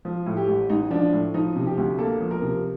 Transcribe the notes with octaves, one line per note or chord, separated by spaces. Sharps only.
F3
A2
G4
A1
A1 D#4
F3 D4
A2
F3 D#4
C3
G4
D2
A#3 A4
F3
A#4
C3